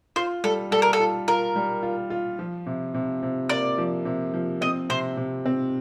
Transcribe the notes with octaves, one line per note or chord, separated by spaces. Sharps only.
F4 C5
G3 A4
G3 A4
A#4
A4
F4
F4 A#4
G3
F4
F4
F3
C3
C3
C3
A#3 D5
F3
C3
F3
C4 D#5
C3 C5
C3
C4